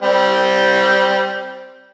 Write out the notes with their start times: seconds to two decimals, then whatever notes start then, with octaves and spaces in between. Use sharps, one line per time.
0.02 G3 C4